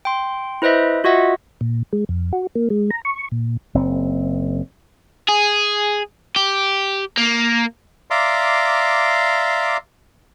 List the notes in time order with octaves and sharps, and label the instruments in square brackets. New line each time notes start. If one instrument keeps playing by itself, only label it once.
[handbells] G5 C6
E4 B4 C5 D#5 E5
F4 F#4 D#5 E5 F#5
[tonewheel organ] A#2
G#3
F2
F#4
A#3
G#3
A#5
C#6
A#2
[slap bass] F#1 C4
[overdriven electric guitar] G#4
G4
A#3
[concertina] D5 E5 F5 A#5 C6 D6